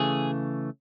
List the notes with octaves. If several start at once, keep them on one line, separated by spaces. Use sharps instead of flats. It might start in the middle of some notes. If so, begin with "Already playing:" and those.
Already playing: C#3 E3 A3 G#4